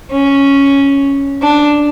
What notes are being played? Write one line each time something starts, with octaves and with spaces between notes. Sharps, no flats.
C#4
D4